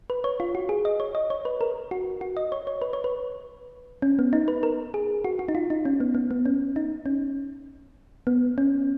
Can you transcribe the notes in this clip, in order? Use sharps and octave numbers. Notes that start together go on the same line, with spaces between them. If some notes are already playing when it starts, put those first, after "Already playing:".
B4
C#5
F4
F#4
G#4
D#5
C#5
D#5
C#5
B4
A#4
F#4
F#4
D#5
C#5
C#5
B4
C#5
B4
C#4
B3
D#4
B4
A#4
G#4
F#4
F#4
D#4
F4
D#4
C#4
B3
B3
B3
C#4
D#4
C#4
B3
C#4